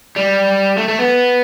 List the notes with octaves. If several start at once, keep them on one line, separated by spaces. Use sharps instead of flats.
G3
A3
A3
B3